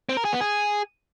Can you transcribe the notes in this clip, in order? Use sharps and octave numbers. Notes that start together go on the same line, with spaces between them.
C4
A#4
G#4
B3
G#4